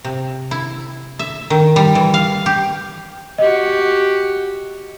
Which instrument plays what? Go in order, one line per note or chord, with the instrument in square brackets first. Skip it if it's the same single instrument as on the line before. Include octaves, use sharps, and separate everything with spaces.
[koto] C3
E4
E5
D#3
G3
E3
F5
G4
[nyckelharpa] F#4 G4 [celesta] D#5